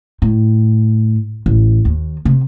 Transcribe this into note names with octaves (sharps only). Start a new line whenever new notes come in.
A2
A1
D#2
C3